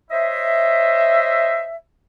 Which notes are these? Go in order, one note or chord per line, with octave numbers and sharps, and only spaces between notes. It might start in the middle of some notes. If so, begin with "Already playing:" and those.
C5 C#5 D#5 E5